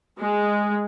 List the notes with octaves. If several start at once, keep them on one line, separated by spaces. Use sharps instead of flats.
G#3